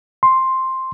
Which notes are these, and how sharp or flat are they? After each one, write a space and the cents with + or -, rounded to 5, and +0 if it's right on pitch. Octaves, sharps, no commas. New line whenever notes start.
C6 +5